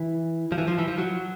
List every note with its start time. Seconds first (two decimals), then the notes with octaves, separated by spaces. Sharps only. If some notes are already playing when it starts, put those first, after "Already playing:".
Already playing: E3
0.52 F3
0.58 E3
0.68 F3
0.78 E3
0.88 F3
0.98 F#3